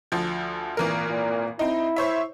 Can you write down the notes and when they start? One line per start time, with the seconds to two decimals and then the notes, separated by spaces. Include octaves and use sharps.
0.12 D2 F3
0.77 G#1 A#2 E3 A#4
1.10 A#2
1.59 C4 D#4 E4
1.96 C5 C#5 E5